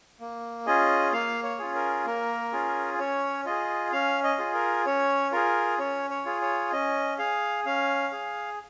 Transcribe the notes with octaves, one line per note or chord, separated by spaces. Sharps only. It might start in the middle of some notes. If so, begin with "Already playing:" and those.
A#3
C#4 F4 G#4 D#5
A#3 F5
C#5
C#4 F4 G#4
A#4
A#3 A#4
C#4 F4 G#4
C#4 C#5
F4 G#4 D#5
C#4 F5
D#5
F4 G#4
A#4
C#4 C#5
F4 G#4 A#4
C#4 C#5
C#5
F4 G#4
C#5
C#4 D#5
G#4 F5
C#4 F5
G#4